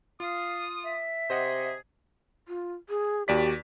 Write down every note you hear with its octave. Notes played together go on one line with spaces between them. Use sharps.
F4 F5 D#6
E5
C3 G#4 C5 D#5 F#5
F4
G#4
D#2 F#4 G4 D5 B6